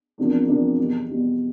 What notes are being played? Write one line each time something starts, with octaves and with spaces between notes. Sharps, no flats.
E2 C3 F3 A#3 D4
E2 C3 F3 A#3 D4
E2 B2 G3
E2 B2 G3